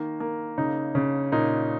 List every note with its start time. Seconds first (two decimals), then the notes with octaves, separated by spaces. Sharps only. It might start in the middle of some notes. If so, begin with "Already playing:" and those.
Already playing: D#3 A#3
0.20 A#3
0.58 C#3 D#4
0.95 C#3
1.32 A#2 D#4